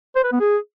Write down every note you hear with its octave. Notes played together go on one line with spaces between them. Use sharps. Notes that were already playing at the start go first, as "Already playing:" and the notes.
C5
B4
B3
G#4